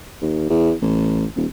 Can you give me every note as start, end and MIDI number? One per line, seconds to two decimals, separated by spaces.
0.22 0.45 39
0.50 0.72 40
0.82 1.25 33
1.36 1.46 27